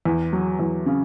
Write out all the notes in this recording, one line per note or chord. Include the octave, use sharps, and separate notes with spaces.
E2
F#3
E2
C#3